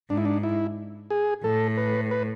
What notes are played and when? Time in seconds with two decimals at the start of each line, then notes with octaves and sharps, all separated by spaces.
0.10 G#2 D4
0.17 E4
0.25 D4
0.43 E4
1.10 G#4
1.44 A2 A4
1.77 B4
2.11 B4